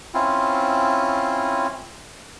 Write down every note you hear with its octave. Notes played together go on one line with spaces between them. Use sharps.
C4 C#4 E4 F4